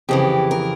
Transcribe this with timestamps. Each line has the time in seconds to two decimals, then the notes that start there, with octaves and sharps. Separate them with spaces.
0.09 F2 C#3 E3 G4
0.51 A#4